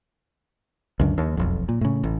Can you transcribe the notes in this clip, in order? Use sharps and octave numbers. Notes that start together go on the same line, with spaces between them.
C#2 F#2 D3
D#2
E1 B1 F2
A#2
A2 C#3
A1